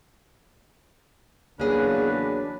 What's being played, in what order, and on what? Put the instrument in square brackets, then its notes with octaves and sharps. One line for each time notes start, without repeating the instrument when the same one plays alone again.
[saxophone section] E2 C#3 F#3 [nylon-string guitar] A#3 G#4 [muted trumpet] D4 [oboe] B4